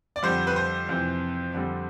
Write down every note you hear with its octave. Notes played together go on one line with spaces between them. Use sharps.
D5
F2 D3 G3 C5
B4
C5
F2 C3 E3
F2 D3 G3 C4